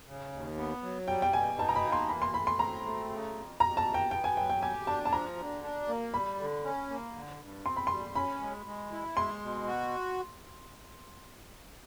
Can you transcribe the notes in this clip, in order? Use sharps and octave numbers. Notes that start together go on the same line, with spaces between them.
C#3
D#2
B3
F#3
G3 G5
G5
B2 G#5
D#4 A5
A#5
B5
A#3
C6
E3 B5
C6
A2 B5
C6
C4 A#5
A3
C#3
F2
F2 A#5
A5
E3
G5
B3 G5
G#5
F#3 G5
G5
G4 G#5
D4 A5
A5
F3 A#5
D3
D4
A#3
G3 B5
D3
C#4
A#3
D3
G2
C4 C6
B5
G3 C6
C#4 B5
G#3
G#3
E4
G#3 C6
B2
F#4